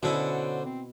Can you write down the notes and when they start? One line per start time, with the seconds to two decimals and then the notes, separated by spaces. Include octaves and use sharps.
0.03 B2 D3 C#4 E4 F#4 C5 D5 F#5
0.65 C4